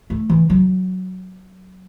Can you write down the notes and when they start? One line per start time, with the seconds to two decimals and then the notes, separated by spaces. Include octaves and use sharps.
0.10 A3
0.30 E3
0.50 F#3